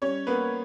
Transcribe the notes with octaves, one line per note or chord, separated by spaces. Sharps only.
G3 C#4 C#5
A#3 B3 B4